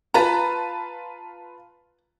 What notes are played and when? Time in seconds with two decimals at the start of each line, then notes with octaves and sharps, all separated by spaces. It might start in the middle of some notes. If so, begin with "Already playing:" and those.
0.14 F4 B4 A5 A#5